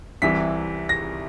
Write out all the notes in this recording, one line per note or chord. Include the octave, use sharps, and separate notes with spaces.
C2 C3 E3 B6
A#6